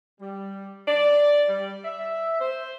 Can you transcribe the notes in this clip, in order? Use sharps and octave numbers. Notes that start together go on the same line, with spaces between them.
G3
D5
G3
E5
C5